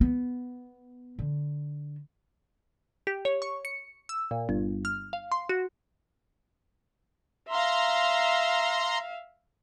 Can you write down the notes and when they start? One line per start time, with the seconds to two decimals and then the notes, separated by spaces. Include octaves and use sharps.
0.01 B3
1.19 D3
3.07 G4
3.25 C#5
3.42 C#6
3.65 C#7
4.09 E6
4.31 A#2
4.49 G1
4.85 F6
5.13 F5
5.32 C6
5.49 F#4
7.49 E5 F5 A#5 C6